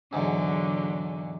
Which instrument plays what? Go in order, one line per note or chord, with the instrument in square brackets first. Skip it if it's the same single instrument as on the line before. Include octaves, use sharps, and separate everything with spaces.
[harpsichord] E2 G#2 [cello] D3 F#3